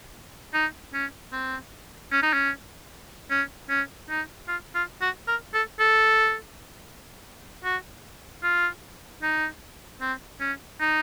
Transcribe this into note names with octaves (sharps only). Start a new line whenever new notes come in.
D#4
C#4
C4
C#4
D#4
C#4
C#4
C#4
D#4
F4
F4
F#4
A#4
A4
A4
F#4
F4
D#4
C4
C#4
D#4